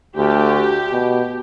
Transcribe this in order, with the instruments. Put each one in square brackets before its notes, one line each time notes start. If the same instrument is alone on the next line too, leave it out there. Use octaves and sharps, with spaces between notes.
[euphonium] D2 [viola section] G4
[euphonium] B2